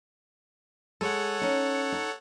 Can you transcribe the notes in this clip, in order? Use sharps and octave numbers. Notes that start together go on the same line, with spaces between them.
G#3 A4 C#5 F#5
C#4 D#4
D#4